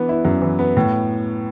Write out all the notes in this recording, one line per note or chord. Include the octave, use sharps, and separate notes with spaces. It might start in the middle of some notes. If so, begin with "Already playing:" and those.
Already playing: E3 B3 D4
E4
F#2
E3
B3
A2